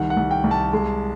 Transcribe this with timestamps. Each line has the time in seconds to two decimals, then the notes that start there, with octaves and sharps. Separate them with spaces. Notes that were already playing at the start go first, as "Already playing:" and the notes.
Already playing: C2 D#3 F#5
0.10 F#5
0.17 C2
0.31 G5
0.44 C2
0.51 A5
0.73 G#3